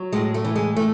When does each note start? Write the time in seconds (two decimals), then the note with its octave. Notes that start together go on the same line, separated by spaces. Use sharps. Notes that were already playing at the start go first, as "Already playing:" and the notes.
Already playing: F#3
0.13 A2 G#3
0.34 A3
0.44 E3
0.56 G#3
0.76 A2 A3